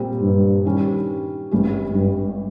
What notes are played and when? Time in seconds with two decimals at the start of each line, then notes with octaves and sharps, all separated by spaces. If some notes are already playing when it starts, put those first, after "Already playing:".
Already playing: A#2 G3 C4
0.22 G2
0.65 D#3 G3 C#4
1.51 G#1 G2 G3 C#4 G4
1.95 G2